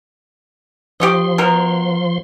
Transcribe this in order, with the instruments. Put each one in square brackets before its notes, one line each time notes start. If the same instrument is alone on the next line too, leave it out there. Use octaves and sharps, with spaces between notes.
[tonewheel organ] F3 C6 [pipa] G4 C#5 D#5
[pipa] B2 A#4